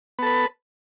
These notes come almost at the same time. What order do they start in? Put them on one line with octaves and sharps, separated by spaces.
B3 A4 B4